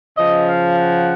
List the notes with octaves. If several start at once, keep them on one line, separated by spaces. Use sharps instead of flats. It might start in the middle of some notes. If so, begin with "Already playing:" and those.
C#3 F3 D#5
F5
F#5